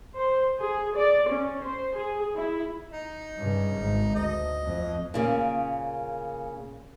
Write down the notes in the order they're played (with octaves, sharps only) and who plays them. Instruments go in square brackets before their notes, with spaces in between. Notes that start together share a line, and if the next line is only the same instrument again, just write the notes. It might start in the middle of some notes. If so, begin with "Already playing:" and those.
[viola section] C5
G#4
D5
C#4
C5
G#4
E4
[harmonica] D#4
[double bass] G2 C#3
G#1
[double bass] D2 [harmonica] D#5
[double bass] F2
[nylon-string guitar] A#2 C#3 A#3